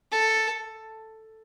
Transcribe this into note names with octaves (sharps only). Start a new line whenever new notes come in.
A4